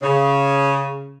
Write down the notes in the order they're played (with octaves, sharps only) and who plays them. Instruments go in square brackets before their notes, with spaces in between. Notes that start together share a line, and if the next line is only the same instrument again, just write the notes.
[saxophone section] C#3